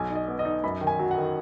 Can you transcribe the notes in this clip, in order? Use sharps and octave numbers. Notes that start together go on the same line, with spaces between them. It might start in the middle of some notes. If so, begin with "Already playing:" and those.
Already playing: B1 G#5
D#4
D#5
B3
D#5
D#4
F#2 B5
D#3
G#5
F#3
F#5
D#3